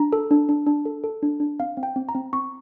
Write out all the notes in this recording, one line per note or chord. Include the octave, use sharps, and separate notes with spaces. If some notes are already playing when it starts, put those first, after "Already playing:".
Already playing: D4 A#5
A4
D4
D4
D4
A4
A4
D4
D4
C4 F5
C4
G5
C4
A#5
C4
C4 C#6